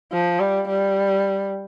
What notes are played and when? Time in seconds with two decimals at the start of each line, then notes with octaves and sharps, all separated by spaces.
0.12 F3
0.40 G3
0.69 G3